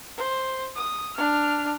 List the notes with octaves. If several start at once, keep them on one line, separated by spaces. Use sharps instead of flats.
C5
D#6
D4 F6